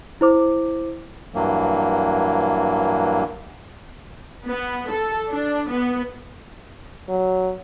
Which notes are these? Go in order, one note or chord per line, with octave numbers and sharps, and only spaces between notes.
E4 C5 D6
G2 E3 F#3 A#3
B3
A4
D4
B3
F#3